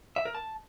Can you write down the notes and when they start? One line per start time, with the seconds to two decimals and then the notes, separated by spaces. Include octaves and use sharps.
0.16 E5
0.25 A#4
0.35 A5